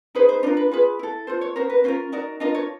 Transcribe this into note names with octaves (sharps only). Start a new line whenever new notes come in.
D#4 G#4 B4 C5
C5
D4 F4 A#4 C5
B4
F4 G#4 B4
E4 A4
F4 A4 C5
C#5
C#4 F#4 A#4 C5
B4
C#4 F4 A#4 C5
D#4 F#4 A#4 D5
D4 F4 A#4 D#5
C#5